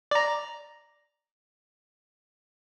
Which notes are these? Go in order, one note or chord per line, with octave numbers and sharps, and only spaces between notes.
D5 A#5